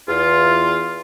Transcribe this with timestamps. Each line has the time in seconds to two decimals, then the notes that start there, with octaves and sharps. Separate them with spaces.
0.08 E2 F4